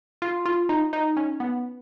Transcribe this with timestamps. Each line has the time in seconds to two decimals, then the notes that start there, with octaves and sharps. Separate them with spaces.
0.22 F4
0.46 F4
0.69 D#4
0.93 D#4
1.17 C#4
1.40 B3